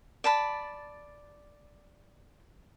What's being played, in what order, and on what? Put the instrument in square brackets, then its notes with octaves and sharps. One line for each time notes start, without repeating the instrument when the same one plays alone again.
[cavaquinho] D5 A5 B5